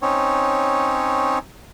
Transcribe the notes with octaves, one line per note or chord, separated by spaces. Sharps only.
C4 C#4 D#4 C#5